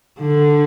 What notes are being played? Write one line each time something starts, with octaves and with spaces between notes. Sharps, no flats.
D3